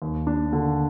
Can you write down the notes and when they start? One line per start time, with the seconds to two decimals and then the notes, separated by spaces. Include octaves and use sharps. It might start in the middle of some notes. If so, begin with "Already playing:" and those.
0.02 D#2
0.27 D4
0.53 D3